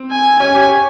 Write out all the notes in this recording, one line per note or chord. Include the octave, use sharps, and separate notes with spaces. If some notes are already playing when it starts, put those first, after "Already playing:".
Already playing: C4
G#5
C#4 G#5
G4
C#5